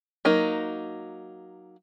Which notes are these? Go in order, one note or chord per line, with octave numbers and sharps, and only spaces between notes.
F#3 A#3 D#4